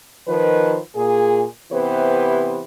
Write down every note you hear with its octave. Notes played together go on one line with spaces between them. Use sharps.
D#3 F3 B4
A#2 G#4
C3 E3 B3 G4 B4 C5